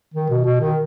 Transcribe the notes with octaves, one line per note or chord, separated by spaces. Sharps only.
D#3
B2
B2
D#3